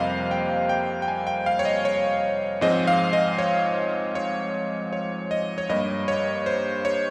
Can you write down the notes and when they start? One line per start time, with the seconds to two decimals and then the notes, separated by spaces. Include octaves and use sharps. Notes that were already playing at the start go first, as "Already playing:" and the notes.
Already playing: F2 C3 G3 A#3 C5 D#5 F5
0.31 G5
0.69 G5
1.02 G5
1.08 G#5
1.27 G5
1.46 F5
1.59 C#5
1.65 D#5
1.85 C#5
2.61 G#2 F3 G#3 C4 D#5
2.87 F5
3.13 D#5
3.38 C#5
4.15 C#5
4.93 C#5
5.31 D#5
5.58 C#5
5.69 G2 G3 A#3 D#5
6.08 C#5
6.46 C5
6.85 C#5